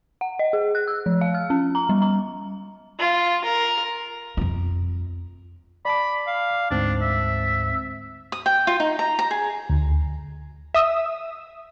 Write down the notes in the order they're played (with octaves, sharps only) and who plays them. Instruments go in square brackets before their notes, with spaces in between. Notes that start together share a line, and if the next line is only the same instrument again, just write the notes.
[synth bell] F#5
D#5
G#4
F#6
E6
F3
F5
F6
C#4
A#5
G3
A#5
[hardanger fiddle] F4
A#4
[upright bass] F2 F4
[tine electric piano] D5 A5 D6 [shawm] B5
[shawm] F5
[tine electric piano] D2 G#2 C4 [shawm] D4
[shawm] E5
[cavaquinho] D#6
G5
F4
D#4
A#5
A#5
G#4
[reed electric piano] D2
[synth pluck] E5 D#6 E6